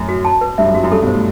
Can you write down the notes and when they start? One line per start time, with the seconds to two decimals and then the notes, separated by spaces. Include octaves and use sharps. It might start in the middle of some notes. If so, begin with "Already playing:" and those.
Already playing: F#2 A2
0.09 F#4
0.25 A5
0.41 B4
0.58 G2 E5
0.66 F#2
0.75 G2 F#4
0.83 F#2
0.92 G2 A4
1.02 G2 B2
1.08 C5
1.13 A2